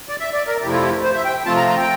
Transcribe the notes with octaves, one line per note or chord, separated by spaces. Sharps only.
D5
E5
D5
A#4
F2 C3 F3 A3 E4 G4
F4
G4
C5
E5
G5
C3 F3 A3 C4 F4 A5
A#5
A#5
G5